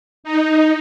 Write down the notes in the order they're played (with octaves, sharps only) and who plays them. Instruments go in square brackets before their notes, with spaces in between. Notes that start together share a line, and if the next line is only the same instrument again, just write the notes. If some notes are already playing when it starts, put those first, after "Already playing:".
[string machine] D#4